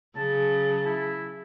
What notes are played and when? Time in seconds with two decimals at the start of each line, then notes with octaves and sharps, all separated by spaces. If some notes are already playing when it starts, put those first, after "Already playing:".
0.16 C#3 F#3 A5
0.86 E4